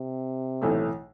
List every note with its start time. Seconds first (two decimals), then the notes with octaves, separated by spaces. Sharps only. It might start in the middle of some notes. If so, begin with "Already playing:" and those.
Already playing: C3
0.62 B1 A2 E3 A3